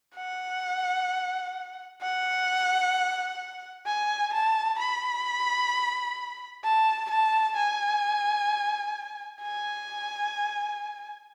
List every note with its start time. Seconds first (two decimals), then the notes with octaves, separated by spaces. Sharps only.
0.16 F#5
2.02 F#5
3.86 G#5
4.33 A5
4.79 B5
6.64 A5
7.10 A5
7.57 G#5
9.42 G#5